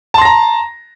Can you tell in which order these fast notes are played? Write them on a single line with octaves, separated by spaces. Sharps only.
A5 C6 A#6 A#5